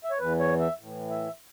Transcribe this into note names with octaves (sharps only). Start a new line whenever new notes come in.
E5
C#5
E2 E3 B4
C#5
E5
A2
E3
E5